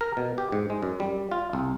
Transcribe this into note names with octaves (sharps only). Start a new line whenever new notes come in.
A#4
B2
G4
G#2
G#3
F#2
G3
F4
C2